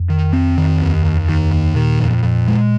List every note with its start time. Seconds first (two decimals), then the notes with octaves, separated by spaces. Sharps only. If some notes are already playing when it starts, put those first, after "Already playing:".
Already playing: F2
0.10 D#3
0.33 C4
0.58 D#3
0.81 D#2
1.05 D#2
1.29 D#3
1.52 D#2
1.76 A#2 D#3
2.00 F2
2.23 F2
2.48 G#3